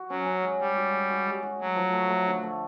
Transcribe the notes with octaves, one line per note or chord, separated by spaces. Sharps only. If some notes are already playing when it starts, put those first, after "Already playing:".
Already playing: F#4
F#3 C#4
C#4
G#3
G3 G#3
F#4
G#3
F#4
G#3
F#4
F#3 A3
F3
A3
A3
D3
A3